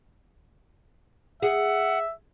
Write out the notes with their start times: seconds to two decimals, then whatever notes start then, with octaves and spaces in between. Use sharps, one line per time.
1.42 G#4 E5 F#5